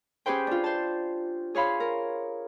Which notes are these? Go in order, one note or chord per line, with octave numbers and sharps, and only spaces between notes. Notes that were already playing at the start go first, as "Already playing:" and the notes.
C#4 G4 G#4 B4 C5 G5
D4 F4
C5 A5
G#4 C#5 F5 B5 C6
A#4